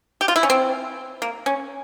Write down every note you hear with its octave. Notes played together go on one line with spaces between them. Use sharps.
G4
F4
E4
C#4
C4
A#3
C#4